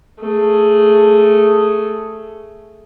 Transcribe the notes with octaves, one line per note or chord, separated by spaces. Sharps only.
A3 G#4